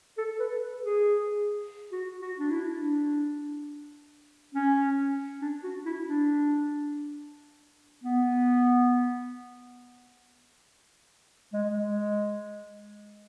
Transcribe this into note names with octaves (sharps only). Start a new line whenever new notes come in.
A4
B4
G#4
F#4
F#4
D4
E4
D4
C#4
D4
F#4
E4
D4
B3
G#3
G#3